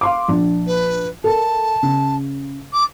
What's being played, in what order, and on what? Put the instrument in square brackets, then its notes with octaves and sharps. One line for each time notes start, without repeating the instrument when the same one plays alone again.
[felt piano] F5 C6 D6
A#1 D4
[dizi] B4
[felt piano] A4 A#4 [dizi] A5
[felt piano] C#3
[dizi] D6